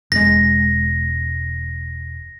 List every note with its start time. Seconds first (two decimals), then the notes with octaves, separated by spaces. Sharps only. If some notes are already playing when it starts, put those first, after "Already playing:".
0.12 E1 G#3 A#6